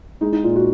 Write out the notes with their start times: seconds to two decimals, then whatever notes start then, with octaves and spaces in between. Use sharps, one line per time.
0.21 G#3 D#4
0.33 D#4
0.44 A#2 F4
0.56 F#4